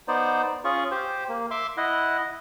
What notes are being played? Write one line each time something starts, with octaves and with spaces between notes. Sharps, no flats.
B3 D#4 C5 D5
C#4 F4 G#4 C#6
G4 C5
A#3
E5 C6 D6
E4 D#5 F#5